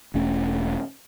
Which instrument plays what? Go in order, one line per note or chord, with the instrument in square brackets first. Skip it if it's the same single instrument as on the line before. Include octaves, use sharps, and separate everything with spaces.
[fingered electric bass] E1 A3 C#4